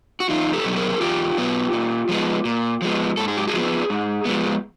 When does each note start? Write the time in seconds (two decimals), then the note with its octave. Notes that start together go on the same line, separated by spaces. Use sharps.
0.20 F#4
0.29 E2 D#4 F4
0.53 G4 A4
0.64 B2 F#3 B3
0.76 G#4 A#4
1.01 E2 F4 G4
1.38 B2 F#3 B3
1.73 A#2
2.09 F3 G#3 B3
2.45 A#2
2.82 F3 G#3 B3
3.17 G#2 A4
3.28 G#4
3.37 G4
3.47 F#4 G#4
3.53 F3 G#3 B3
3.90 G#2
4.25 F3 G#3 B3